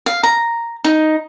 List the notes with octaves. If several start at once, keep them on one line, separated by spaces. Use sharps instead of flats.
F5
A#5
D#4